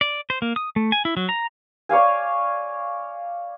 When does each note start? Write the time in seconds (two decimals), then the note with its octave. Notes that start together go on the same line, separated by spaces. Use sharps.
0.01 D5
0.30 C5
0.42 A#3
0.56 D#6
0.76 A3
0.92 G#5
1.05 E4
1.17 F#3
1.29 A#5
1.89 C#5 D5 F5 G#5